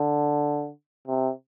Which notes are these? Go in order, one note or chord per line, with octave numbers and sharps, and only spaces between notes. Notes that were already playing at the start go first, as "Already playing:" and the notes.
Already playing: D3
C3